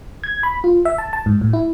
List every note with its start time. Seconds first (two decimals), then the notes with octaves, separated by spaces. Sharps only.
0.24 G#6
0.43 B5
0.64 F4
0.85 E5
0.98 A5
1.13 A5
1.26 G#2
1.41 A2
1.53 E4